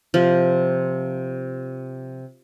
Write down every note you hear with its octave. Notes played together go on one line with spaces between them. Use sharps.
C3 F3